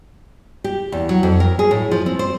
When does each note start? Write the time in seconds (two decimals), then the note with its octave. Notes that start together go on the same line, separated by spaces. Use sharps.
0.64 G4
0.92 E2
1.09 F#3
1.23 F2
1.40 A#4
1.59 G#4
1.71 A2
1.91 F3
2.06 C4
2.19 C5